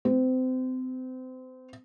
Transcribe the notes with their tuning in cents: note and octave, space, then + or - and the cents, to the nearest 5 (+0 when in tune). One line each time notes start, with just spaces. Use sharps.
C4 -30